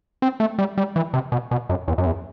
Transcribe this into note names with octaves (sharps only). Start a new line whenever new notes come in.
C4
A3
G3
G3
E3
C3
B2
B2
F#2
E2
F#2
E2